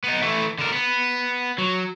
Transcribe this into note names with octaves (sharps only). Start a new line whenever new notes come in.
B3 D#4
E3 A3
D3 A#4
B3
F#3